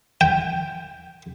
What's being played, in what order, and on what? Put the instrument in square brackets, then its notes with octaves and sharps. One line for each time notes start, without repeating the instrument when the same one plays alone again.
[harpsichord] G5